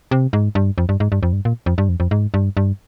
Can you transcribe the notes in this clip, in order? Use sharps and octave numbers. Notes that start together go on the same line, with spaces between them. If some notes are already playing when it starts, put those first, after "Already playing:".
C3
G#2
G2
F2
G2
G#2
G2
F2
G2
A#2
F2
G2
F2
F2
G#2
G2
G2